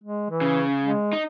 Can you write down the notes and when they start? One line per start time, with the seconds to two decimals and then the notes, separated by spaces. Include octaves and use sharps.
0.04 G#3
0.30 E3
0.41 C#3
0.82 G#3
1.13 D#4